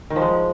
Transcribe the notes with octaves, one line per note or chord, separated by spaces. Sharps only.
D#3
F3
G#3